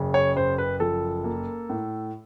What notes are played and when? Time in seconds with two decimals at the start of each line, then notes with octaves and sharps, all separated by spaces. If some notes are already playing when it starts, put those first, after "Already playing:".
Already playing: F#1 C#3
0.14 C#5
0.35 F#1 C5
0.58 B4
0.80 F3 A4
1.24 A#3
1.70 A2